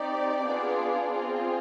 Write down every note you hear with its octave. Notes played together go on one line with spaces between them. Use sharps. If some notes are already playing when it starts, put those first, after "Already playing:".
Already playing: C4 D#4 G4 D5
B3 D4 F4 G#4
C4 F4 G#4